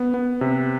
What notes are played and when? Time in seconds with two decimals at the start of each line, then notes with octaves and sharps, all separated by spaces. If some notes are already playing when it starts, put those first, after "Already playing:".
Already playing: B3
0.14 B3
0.41 C3